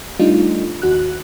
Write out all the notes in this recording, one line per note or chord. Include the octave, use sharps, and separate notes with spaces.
G3 A3 D4 D#4 F4
D#2 F#4 F#6